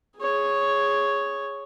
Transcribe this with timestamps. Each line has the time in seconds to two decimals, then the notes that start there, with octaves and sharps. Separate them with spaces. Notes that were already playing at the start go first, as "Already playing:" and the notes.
0.17 G#4 C#5